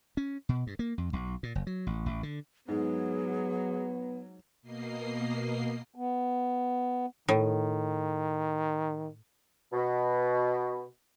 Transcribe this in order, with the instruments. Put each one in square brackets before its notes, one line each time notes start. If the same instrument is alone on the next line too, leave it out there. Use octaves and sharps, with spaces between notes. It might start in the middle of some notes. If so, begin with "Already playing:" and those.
[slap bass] C#4
B2
G2
A#3
F2
B1
A#2
F#1
F#3
A1
A1
D3
[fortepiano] G#2 [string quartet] F#3 [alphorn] B3 [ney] G#4
[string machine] B2 A#3 D#5 C7
[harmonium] B3
[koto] A2 [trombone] D#3
[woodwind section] B2